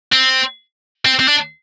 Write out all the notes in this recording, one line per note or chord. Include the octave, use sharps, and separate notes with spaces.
C4
C4
C4
D4